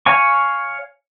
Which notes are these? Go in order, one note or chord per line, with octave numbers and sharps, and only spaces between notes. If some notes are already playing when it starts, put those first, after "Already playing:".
C#5 F5 G#5 C#6